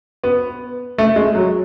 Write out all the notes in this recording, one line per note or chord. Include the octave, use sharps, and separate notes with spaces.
B3
A3
G#3
F#3